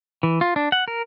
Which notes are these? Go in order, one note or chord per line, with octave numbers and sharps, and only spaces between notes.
E3
F4
D4
F#5
A#4